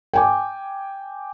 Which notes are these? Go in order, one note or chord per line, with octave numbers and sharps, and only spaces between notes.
G5 G#5 D6